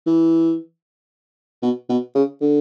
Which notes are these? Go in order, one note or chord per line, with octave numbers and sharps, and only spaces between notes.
E3
B2
B2
C#3
D3